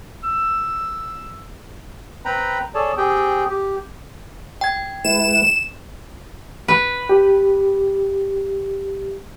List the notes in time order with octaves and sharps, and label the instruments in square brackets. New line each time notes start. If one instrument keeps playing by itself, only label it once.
[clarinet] E6
[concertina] C4 B4 G5 A#5 B5
G#4 A4 C#5 D5 A5
C4 G4 G#4 G5
G4
[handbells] G5 G#6
[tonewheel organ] G#3 E4 B4 [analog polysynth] E7
[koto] B4
[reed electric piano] G4